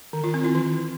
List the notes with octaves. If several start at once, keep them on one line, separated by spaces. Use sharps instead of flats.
D#3
F4
C4
E4
E3